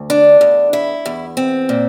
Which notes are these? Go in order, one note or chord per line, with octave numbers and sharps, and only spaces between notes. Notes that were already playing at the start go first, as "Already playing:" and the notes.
Already playing: D2
D4
E2
E4
E2
C4
A#2